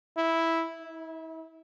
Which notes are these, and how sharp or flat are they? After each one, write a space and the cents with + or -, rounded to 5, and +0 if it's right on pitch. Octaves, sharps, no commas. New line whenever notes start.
E4 -5
E4 -40